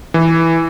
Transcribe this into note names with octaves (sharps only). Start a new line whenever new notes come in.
E3